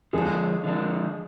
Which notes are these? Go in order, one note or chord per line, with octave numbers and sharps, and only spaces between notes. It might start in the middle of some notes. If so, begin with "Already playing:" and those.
D3 F3 G#3 D4 G#4
D3 F3 G#3 D4